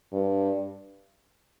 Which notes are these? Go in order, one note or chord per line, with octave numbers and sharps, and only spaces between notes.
G2